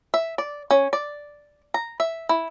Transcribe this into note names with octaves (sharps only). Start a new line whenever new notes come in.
E5
D5
C#4
D5
A#5
E5
E4